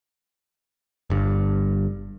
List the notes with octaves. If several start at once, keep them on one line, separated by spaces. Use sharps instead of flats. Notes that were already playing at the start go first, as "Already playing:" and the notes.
G1 G2